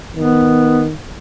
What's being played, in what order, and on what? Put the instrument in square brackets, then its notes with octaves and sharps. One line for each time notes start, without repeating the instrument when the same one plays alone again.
[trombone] D#3 [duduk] B3